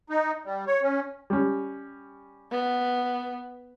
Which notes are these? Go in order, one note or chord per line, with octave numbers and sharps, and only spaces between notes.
D#4
G3
C#5
C#4
G3 C#4
B3